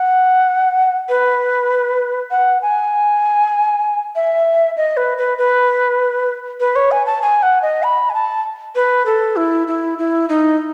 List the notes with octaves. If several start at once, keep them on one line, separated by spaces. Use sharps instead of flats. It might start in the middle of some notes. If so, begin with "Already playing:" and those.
Already playing: F#5
B4
F#5
G#5
E5
D#5
B4
B4
B4
B4
C#5
G#5
A5
G#5
F#5
D#5
B5
G#5
A5
B4
A4
E4
E4
E4
D#4